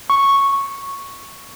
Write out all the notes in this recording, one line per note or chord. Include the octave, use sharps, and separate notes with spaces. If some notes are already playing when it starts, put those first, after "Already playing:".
C#6